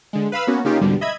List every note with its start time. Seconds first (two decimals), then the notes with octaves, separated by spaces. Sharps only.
0.13 D3 G#3
0.32 B4 F5 B5 E6
0.47 A#3 B3 C#4 F#4
0.65 C#3 A#3 C#4 D#4 F4 G4
0.81 C2 G#2 B2 D3 G3
1.01 D#5 E5 B5 G#6